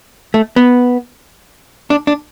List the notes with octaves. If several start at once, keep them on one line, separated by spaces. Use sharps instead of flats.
A3
B3
D4
D4